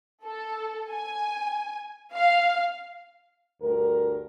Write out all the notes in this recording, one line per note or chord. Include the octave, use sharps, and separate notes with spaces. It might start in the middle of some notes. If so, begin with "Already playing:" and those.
A4
G#5
F5
D2 G2 A#4